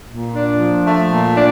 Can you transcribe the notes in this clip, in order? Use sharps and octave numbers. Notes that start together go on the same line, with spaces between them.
A#2
D4
F3
A3
A#2
D4